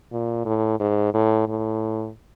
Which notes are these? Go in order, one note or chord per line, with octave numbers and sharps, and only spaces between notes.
A#2
A2
G#2
A2
A2